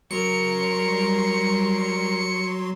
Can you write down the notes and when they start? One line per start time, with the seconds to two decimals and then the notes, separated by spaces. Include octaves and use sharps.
0.11 C#3 F#3 A#4 C6 C#7
0.68 G3 C7